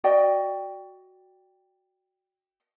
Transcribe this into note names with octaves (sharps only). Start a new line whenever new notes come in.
F#4 D5 D#5 G5